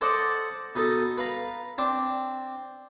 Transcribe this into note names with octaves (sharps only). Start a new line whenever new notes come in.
A4 C5 D5 D#5 F#5 A5
B2 D#4 A4
B4 F5 A#5
C4 D4